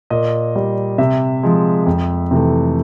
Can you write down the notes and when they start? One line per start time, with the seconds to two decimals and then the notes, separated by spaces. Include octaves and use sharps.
0.10 A#2 D#5
0.56 G3
0.98 C3 E5
1.43 F3 G#3
1.87 F2
2.31 C3 E3 A3